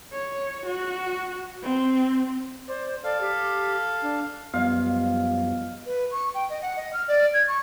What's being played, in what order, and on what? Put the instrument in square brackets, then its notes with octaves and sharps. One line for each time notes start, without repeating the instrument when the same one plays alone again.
[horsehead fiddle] C#5
F#4
C4
[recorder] C5 [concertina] D5
[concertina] A4 F5 [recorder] D5
[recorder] G4
D4
[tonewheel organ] F#2 F3 G3 [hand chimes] B3 D#5 [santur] F5
[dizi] B4
C#6
G5
D#5
F#5
D#5
F6
D5
G#6
C#6